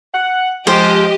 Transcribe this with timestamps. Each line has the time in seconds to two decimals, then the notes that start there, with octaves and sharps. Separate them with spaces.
0.13 F#5
0.67 F3 G#3 G4 C5 D#5